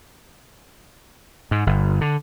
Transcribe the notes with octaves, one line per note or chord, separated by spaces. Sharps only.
G#2
G1
D3